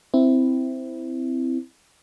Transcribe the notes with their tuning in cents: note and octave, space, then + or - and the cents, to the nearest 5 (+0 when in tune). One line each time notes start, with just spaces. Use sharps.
C4 -10 E4 +0